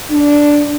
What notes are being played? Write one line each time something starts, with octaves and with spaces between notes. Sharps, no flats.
D4